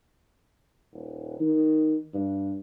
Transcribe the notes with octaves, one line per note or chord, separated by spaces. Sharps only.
D#1
D#3
G2